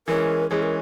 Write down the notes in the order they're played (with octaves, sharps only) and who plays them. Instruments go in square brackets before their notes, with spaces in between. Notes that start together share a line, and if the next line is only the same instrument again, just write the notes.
[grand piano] E3 G#3 C#4 [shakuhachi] A#4
[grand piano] E3 G#3 C#4 [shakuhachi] G#4
[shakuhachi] A#4